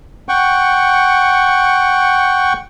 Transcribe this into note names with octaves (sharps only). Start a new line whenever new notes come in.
F#5 G5 C#6